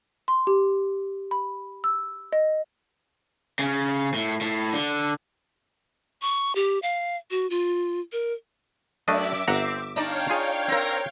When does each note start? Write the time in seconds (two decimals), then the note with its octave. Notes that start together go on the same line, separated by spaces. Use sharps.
0.28 C6
0.47 G4
1.31 B5
1.84 E6
2.33 D#5
3.59 C#3
4.14 A2
4.41 A2
4.73 D3
6.22 C#6
6.55 G4
6.82 F5
7.31 F#4
7.50 F4
8.12 A#4
9.08 F#2 A3 D4 D#5 E5 D6
9.48 G1 C4 F#5 A#5
9.96 D4 D#4 C#5 D5 F5 G5
10.30 F4 G#4
10.68 C4 A#4